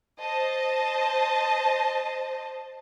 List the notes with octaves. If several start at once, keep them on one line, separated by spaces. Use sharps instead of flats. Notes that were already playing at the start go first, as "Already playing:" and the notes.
C5 D#5 A5